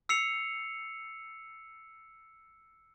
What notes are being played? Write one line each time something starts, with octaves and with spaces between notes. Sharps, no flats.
E6 C7 C#7 F7